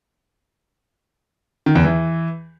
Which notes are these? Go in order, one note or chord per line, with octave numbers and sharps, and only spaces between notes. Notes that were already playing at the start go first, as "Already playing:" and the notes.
D#3
E2
E3